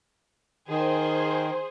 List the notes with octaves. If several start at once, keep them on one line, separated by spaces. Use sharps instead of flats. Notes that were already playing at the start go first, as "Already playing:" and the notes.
D#3 G#4 C5